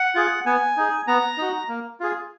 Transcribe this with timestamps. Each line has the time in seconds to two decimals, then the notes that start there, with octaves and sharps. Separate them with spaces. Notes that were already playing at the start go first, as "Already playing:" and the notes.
Already playing: F#5
0.15 F4 G#4
0.46 B3 G#5
0.77 D#4 G#4
1.07 B3 A#5
1.38 D#4 F#4
1.69 A#3
2.00 F4 G#4